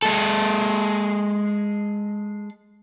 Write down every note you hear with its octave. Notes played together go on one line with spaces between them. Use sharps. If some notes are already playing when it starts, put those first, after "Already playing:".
G#3 A4